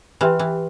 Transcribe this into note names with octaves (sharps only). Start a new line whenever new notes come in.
E3 G4 B4 E5 G5 C6
E3